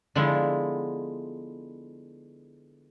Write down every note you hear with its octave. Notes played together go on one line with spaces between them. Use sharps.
D3 F3 G#3 B3 E4